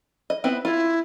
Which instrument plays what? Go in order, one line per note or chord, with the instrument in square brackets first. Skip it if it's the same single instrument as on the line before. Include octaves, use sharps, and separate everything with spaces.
[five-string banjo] D#5
B3 C4 E4
[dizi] E4 [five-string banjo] F4